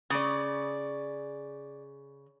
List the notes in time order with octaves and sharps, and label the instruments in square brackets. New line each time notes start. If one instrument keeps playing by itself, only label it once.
[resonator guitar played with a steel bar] C#3 [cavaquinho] D5 D#6